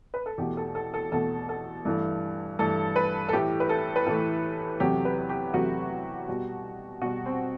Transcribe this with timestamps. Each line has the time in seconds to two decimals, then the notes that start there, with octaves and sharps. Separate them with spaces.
0.14 B4
0.26 A4
0.38 E2 B2 A3 G4
0.57 A4
0.75 A4
0.94 A4
1.12 E2 B2 A3 A4
1.49 A4
1.85 G2 E3 A3
2.59 G2 E3 A3 A4
2.96 B4
3.29 A4
3.33 A2 E3 A3 G4
3.60 B4
3.69 A4
3.96 B4
4.06 A2 E3 A3 A4
4.80 E2 C3 F#3 A3 G4
5.05 B4
5.29 G4
5.54 E2 C3 F#3 A3 F#4
6.28 B2 G3
7.01 B2 G3 F#4
7.26 C4